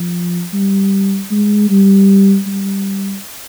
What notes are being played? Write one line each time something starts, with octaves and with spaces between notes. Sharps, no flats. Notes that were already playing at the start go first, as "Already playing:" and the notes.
Already playing: F3
G3
G#3
G3
G3